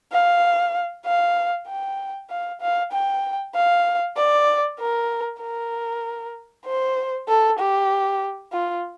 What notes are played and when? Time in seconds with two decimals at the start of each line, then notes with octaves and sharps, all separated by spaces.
0.12 F5
1.05 F5
1.68 G5
2.30 F5
2.61 F5
2.92 G5
3.55 F5
4.17 D5
4.79 A#4
5.41 A#4
6.66 C5
7.28 A4
7.59 G4
8.53 F4